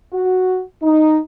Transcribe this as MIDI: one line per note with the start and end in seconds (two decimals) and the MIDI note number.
0.13 0.61 66
0.82 1.19 63